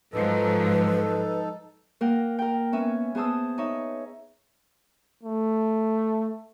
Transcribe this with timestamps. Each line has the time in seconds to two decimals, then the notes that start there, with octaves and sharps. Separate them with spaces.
0.13 G#2 F3 F#3 D#4 A4 B4
2.01 A#3 A#4 F#5 G5
2.39 A#4 G5
2.72 B3 C#4 E5 G#5
3.15 B3 G#4 C5 A5 D#6 E6
3.58 D#4 C#5 E5
5.24 A3